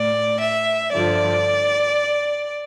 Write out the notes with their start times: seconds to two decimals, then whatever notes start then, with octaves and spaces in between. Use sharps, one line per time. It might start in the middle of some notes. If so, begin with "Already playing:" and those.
Already playing: A2 D5
0.41 E5
0.92 G2 D3 F3 D5